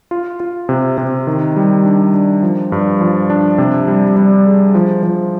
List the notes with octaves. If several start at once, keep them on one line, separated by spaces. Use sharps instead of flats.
F4
F4
C3
C3
D#3
G3
D4
D4
F3
G2
F3
D4
C3
G3
G3
G#4
F3
F3